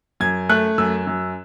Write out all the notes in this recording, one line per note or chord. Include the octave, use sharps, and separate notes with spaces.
F#2 G#6
A3 F#6
F#2 E6
F#2